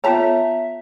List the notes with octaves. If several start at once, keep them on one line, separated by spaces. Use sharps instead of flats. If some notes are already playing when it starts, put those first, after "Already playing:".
B3 F4 A4 C#5 E5 G5 A5 A#5